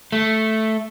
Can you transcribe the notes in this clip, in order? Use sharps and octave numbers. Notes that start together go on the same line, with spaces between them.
A3